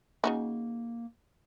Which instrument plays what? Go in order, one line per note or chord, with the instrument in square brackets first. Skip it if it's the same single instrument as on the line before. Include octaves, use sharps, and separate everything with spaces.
[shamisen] C#3 D#4 F#4 [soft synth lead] A#3